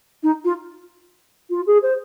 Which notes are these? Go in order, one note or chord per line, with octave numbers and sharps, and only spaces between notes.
D#4
F4
F4
G#4
C5